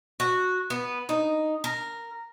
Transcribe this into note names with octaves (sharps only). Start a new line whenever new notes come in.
F#4
B3
D#4
A#4